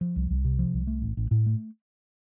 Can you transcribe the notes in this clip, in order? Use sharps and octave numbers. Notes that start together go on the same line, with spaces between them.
F3
C2
C2
C3
F3
C2
A3
A1
A1
A2
A3